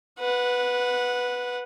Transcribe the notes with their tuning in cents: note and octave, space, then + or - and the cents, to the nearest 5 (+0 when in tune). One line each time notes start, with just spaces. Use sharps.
B4 +0 F#5 -15